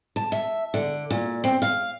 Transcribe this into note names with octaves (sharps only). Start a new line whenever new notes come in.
A5
E5
D3
A#2
C4
F5